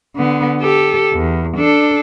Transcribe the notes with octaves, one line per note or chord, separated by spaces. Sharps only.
D3 B3
G4 A4
E2
D4 A4